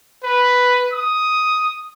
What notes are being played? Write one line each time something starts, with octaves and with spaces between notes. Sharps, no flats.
B4
D#6